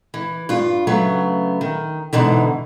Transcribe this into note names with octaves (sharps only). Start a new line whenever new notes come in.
E3
G2 F4
C#3 F#3 A3 B3
D#3
G#2 B2 D3 E3